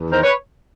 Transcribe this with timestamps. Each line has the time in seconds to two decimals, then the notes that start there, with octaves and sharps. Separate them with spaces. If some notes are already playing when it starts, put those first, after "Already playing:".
Already playing: E2
0.11 D#3 A#4 C5
0.24 B4 C#5